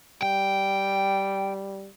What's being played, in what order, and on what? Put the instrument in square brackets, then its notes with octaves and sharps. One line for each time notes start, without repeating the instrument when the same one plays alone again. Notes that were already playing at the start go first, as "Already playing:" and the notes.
[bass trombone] G3 [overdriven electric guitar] G5